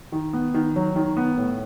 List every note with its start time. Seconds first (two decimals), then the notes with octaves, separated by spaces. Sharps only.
0.12 D#3
0.33 B3
0.54 D#3
0.76 F#3
0.96 D#3
1.17 B3
1.37 A2